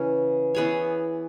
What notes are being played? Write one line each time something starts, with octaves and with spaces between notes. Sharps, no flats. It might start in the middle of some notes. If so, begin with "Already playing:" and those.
Already playing: C#3 E3 C#4
E3 B3 G#4 C#5